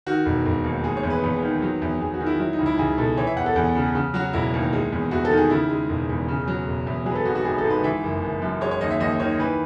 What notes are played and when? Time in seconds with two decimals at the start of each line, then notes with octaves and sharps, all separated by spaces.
0.06 D#3 F#4
0.26 E1
0.46 E1
0.64 D#2
0.84 G#3 G#4
0.97 C#5
1.03 E2
1.10 B4
1.23 E2
1.42 D#3
1.62 F#3
1.82 E2
2.00 E2 G#4
2.14 F#4
2.21 D#3
2.26 E4
2.39 F#3 E4
2.53 D#4
2.59 C#2
2.66 E4
2.78 C#2 G#4
2.98 B2 A4
3.17 E3 C#5
3.27 E5
3.36 E2 F#5
3.46 A4
3.56 E2
3.76 C#3
3.95 C#3
4.14 F#3 F#4
4.33 E1 E4
4.54 D#2
4.73 G#3
4.92 E2
5.11 E2 F#4
5.25 A4
5.31 D#3
5.37 G#4
5.50 C#3 E4
5.70 G#3
5.89 E1
6.09 E2
6.28 C#3
6.47 F#3
6.67 E1
6.87 E2
7.06 F#3 G#4
7.11 B4
7.15 A4
7.25 G#1 F#4
7.35 F#4
7.45 G#1 G#4
7.58 A4
7.64 G#2
7.70 B4
7.84 E3 E5
8.03 F#1
8.22 F#1
8.42 F#2
8.61 G#3 C#5
8.71 C#5
8.81 D#2 D#5
8.91 E5
9.00 D#2 D#5
9.20 D#3 C#5
9.39 E3 B4